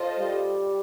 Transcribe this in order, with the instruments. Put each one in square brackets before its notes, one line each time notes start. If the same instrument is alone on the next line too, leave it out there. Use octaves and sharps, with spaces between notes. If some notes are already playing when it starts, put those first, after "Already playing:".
Already playing: [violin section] F4 A4 C5 D#5
[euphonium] G3